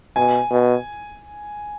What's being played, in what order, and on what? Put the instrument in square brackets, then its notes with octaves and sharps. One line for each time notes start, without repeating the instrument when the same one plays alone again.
[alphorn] B2 [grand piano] G#5
[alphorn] B2